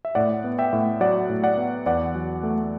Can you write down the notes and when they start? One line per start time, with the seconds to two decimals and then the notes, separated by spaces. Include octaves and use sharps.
0.05 E5
0.15 A2 D5 F#5
0.44 B3
0.59 E5 G5
0.73 A2
1.01 F#3 D5 F#5
1.29 A2
1.44 D5 F#5
1.57 B3
1.86 E2 D5 F#5
2.15 F#3
2.43 A3